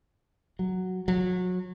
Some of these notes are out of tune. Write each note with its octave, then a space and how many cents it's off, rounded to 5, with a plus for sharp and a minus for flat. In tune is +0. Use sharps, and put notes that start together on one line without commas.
F#3 +0
F#3 -25